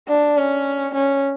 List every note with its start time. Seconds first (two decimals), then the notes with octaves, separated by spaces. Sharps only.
0.08 D4
0.37 C#4
0.94 C#4